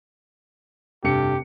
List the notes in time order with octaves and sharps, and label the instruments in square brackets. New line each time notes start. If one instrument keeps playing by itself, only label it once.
[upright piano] F1 G2 C#7 [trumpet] G4